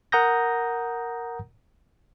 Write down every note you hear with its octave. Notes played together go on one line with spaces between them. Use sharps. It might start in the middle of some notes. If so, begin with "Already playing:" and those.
A#4 F#5 A#5 D#6 G6 A#6